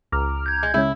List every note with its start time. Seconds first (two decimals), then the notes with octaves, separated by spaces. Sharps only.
0.12 C#2 A#5 D6 F6
0.46 G6 G#6
0.63 G#3
0.74 C#3 G#3 C#4 E4